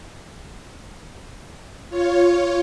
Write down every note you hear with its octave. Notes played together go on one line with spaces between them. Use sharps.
F4 C#5